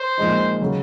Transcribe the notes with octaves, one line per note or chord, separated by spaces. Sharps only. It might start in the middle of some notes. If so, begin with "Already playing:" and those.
Already playing: C5
A#2 F3 G#3 D#4
C#3 F#3